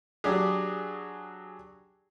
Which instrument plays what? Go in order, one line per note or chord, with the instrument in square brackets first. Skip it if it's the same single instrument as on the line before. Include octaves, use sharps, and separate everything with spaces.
[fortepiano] F#3 D4 G4 G#4